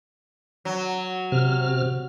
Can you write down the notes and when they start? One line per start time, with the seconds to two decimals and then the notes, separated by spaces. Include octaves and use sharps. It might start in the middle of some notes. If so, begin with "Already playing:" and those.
0.65 F#3
1.32 C3 F6